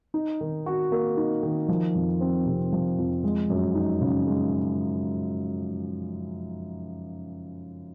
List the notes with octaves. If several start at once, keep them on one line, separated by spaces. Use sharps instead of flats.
D#4
D#3
F#4
A#3
D#4
D#3
F3
F2
C4
C3
F3
F2
G#3
F#2
D#4
C#3
G#3